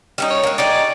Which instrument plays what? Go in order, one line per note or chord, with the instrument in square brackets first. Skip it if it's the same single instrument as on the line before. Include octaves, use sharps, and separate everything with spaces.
[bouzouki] G3 C#4 D#4
[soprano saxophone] C#5
[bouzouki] G#3 A#3
[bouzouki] D#4 G4 G#4 [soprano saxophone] D5